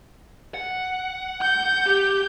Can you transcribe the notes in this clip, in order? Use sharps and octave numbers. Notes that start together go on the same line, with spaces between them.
F#5
G6
G4